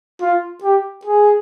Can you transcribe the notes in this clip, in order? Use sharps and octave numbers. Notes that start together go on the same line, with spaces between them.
F4
G4
G#4